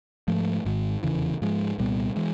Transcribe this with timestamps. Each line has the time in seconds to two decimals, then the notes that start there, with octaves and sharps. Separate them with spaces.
0.28 G#2 F3 A3
0.65 G#1 G#2 D#3
1.03 F1 E2 C#3 E3
1.42 G#2 F3 G#3
1.78 C2 A#2 G3 B3
2.16 E3 G#3